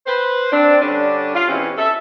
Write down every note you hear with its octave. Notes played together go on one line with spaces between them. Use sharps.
B4 C5
C4 D4
D3 G3 C#4 D4
F4
E2 B2 E3 C4 C#4 G4
A4 E5